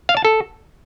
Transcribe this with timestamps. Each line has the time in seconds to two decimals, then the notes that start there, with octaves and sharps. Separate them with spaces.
0.09 F5
0.17 A5
0.25 A4